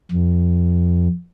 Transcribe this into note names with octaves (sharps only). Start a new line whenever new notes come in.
F2